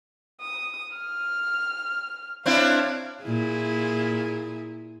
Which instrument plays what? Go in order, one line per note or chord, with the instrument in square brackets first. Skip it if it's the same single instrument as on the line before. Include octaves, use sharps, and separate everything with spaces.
[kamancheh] D#6
F6
[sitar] C4 D4 E4 [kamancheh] C#5 F5
[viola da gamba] A#2 E4 G#4